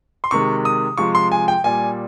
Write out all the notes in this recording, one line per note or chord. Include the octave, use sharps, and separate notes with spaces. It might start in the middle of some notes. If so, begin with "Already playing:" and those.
C6
C3 D#3 G#3 C#6
D#6
C3 F3 G#3 C#6
C6
G#5
G5
A#2 G3 G#5